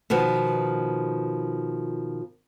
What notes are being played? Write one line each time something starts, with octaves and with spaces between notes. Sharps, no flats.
B2 D#3 F3 B3